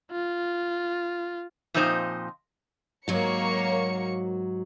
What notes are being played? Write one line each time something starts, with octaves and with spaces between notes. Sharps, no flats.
F4
F2 A#2 F3 D#4 C5 D#5
G#2 F#3 A#3 F#4 C#5 C#7